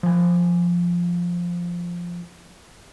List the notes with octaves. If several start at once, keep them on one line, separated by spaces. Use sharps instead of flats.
F3 G#5